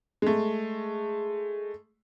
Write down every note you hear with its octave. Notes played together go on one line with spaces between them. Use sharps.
G#3 A3